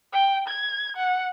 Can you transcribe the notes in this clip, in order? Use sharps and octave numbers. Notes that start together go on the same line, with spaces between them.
G5
G#6
F#5